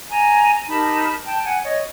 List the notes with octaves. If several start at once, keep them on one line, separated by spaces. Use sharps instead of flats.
G#5 A#5
D#4 G4 A#4 A5 B5
G5 A5
F#5 G#5
C#5 D#5